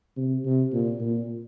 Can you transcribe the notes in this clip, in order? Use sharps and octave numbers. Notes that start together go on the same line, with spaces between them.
C3
C3
A#2
A#2